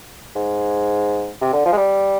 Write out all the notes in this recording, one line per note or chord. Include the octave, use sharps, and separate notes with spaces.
G#2
C3
D3
F3
G#3
G3